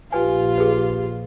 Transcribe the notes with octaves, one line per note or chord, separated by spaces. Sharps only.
A#1 F4 G4 B4 G#5
G#4 B4